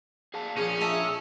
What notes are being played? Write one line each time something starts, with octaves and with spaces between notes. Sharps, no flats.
G#4 F5 A5
A#2 F3 C#4 F4 G#4
A4 D#5 E5